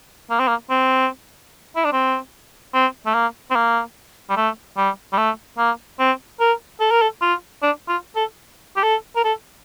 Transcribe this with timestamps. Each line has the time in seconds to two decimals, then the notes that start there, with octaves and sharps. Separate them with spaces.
0.30 A#3
0.40 C4
0.48 A#3
0.70 C4
1.76 E4
1.84 D4
1.93 C4
2.74 C4
3.06 A3
3.14 A#3
3.50 C4
3.55 A#3
4.30 G3
4.37 A3
4.77 G3
5.13 G3
5.18 A3
5.58 A#3
5.99 C4
6.40 A#4
6.80 A4
6.91 A#4
7.01 A4
7.21 F4
7.62 D4
7.88 F4
8.16 A4
8.76 G4
8.83 A4
9.16 A#4
9.24 A4